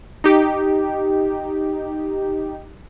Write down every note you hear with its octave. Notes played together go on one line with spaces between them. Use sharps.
D#4 G4